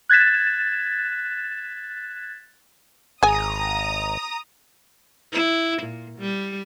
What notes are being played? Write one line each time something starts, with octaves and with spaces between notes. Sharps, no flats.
F#6 G#6 A6 B6 E7
G#1 G#4 G#5 A#5 D#6
E4
A#2
G3